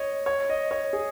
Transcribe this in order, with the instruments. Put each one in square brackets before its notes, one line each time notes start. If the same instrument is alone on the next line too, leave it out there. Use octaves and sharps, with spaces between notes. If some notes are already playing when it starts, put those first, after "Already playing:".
Already playing: [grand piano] C#5 D#5
C#5
D#5
C#5
G#4